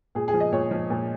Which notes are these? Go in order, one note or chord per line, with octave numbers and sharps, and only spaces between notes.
A#2 G#4
G#4
F3
D#5
A#2 C#5
F3
A#2